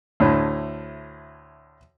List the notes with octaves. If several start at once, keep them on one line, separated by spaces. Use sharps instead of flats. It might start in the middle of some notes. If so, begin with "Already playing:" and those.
D2 A2